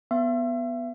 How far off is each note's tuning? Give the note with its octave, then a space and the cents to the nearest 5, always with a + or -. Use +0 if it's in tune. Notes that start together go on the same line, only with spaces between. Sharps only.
B3 +0 E5 +40